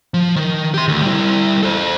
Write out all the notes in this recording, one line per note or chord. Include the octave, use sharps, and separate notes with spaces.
F3
D#3
G4 C6
D2
G3 E4
A4 C5